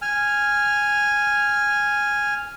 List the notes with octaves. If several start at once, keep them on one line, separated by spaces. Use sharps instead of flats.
G#5 F6